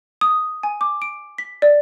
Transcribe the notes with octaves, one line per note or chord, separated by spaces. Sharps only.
D#6
G#5
D6
D7
B6
D5